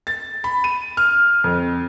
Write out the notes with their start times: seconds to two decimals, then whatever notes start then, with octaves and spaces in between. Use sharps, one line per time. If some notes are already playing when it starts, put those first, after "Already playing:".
0.07 A6
0.44 B5
0.64 D#7
0.97 F6
1.44 F2